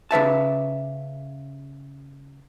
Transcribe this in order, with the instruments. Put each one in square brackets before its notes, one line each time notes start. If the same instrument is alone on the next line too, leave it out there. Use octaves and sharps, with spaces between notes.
[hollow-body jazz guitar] C#3 B4 E5 A5